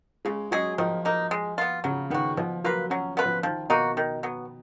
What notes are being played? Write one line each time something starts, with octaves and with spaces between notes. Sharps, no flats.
C#3 G#3
F#3 G#3 C#4 G#4
D#3 F3
A#3 D#4
G#3
B3 F4
C#3 F#3
D#3 B3 F#4
B2 F3
F#3 A#3 F4 B4
F#3 C#4
B3 F4 B4
F3
D#3 F3
B2 A#3 D#4 F#4
D#3
F#3 B3